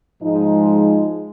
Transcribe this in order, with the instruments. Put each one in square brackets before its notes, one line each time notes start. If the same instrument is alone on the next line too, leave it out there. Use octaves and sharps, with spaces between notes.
[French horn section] G#2 F3 G#3 D#4